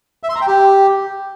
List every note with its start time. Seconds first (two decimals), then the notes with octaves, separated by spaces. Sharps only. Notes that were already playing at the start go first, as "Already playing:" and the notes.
0.23 E5
0.29 C6
0.35 A#5
0.41 G5
0.47 G4